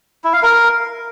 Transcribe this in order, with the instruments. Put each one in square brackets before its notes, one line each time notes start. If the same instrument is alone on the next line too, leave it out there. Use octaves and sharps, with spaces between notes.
[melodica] E4
F5
A#4